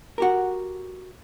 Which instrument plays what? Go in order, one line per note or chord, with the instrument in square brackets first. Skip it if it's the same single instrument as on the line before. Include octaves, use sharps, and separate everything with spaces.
[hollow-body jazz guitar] F#4 G4 A#4